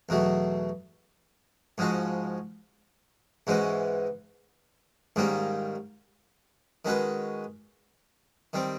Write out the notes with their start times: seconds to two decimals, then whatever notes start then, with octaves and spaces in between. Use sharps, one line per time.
0.09 E2 B2 F#3 A3
1.78 G#2 F3 G#3 C#4 F#4
3.47 G#2 E3 G#3 C#4 F#4
5.16 G#2 D#3 G3 A#3 C#4
6.85 D#3 G#3 C#4 F#4 B4
8.53 D#3 G3 C4